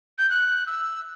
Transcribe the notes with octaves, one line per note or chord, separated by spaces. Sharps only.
G6
F#6
E6